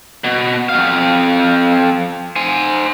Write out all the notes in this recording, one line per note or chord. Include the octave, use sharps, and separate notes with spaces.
B2
F2 F5
C5 G#5